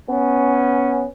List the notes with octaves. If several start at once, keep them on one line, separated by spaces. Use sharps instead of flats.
B3 C#4